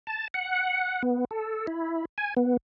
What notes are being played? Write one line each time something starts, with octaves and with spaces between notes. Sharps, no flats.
A5
F#5
B3
A4
E4
G#5
B3